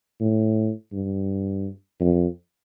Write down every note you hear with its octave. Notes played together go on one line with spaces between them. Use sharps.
A2
G2
F2